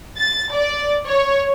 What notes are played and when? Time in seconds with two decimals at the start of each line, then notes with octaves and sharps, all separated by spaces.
0.17 A6
0.53 D5
1.07 C#5